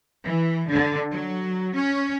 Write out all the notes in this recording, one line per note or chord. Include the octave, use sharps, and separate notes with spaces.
E3
D3
F#3
C#4